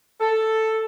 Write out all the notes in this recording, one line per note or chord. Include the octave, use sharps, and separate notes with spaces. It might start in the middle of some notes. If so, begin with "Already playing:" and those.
A4